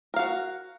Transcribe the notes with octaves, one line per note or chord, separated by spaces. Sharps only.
F#4 A#4 F5